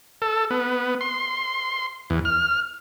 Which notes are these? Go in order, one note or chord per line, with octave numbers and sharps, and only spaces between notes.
A4
B3
C6
E2
F6